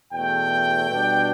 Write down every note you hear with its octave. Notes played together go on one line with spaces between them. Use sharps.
E2 B2 A3 G5
B2 G3 D4